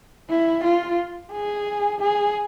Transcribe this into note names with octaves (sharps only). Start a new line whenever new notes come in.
E4
F4
G#4
G#4